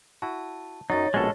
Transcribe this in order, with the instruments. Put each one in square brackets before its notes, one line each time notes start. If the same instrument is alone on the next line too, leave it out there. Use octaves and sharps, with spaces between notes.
[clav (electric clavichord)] E4 F#4 [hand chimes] A5
[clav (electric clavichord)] F#2 F#3 [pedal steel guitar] D#4 [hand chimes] C#5 A6
[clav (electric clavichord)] A#1 B2 D#5 [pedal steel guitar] G#3 C#4 A4